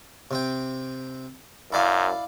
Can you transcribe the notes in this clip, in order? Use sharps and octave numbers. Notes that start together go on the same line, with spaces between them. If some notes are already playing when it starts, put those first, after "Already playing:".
C3 C4 G5
F#2 E4 D5 F5